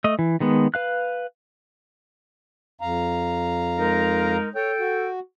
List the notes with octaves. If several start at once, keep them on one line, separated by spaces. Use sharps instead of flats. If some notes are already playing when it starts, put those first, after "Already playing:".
A3 D#5
E3
D#3 G#3 B3
B4 F5 F#6
F2 F5 A#5
G#3 D#4 A#4
A4 C#5 G5
F#4